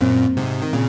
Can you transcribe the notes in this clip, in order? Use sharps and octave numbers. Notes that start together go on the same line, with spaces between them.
F#2 A#2 C4
G#2 C3
D#3
A#2 C#3